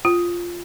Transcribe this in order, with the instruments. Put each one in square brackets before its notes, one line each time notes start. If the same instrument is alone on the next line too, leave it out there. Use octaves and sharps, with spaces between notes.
[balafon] F4